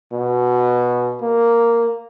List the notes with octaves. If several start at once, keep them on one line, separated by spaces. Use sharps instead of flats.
B2
A#3